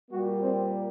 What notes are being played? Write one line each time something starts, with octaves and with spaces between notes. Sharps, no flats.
A#2 G3 A#3 F#4
C4